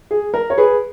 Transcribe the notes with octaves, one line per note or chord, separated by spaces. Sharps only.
G#4
A#4
C#5
G#4 B4